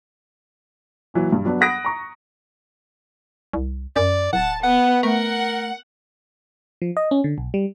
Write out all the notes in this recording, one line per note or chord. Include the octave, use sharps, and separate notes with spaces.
A#2 E3 F#3
G2
F#3 B3 D4
F#5 B5 D#6 F#6 A#6 D7
A#5 C#6
C2
F#2 D5
D1 F#5 A5
B3 F#5
A3 A#4 F#5
F3
D#5
C#4
D3
B1
G3